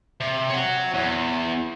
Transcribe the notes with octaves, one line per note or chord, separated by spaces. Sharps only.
C3
C#5 F#5
E2